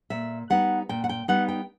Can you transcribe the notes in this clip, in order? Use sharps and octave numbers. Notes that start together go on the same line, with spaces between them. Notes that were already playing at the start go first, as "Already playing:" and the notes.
A#2 E5
G3 B3 D#4 F#5
A#2 G5
F#5
G5
G3 B3 D#4 F#5
G5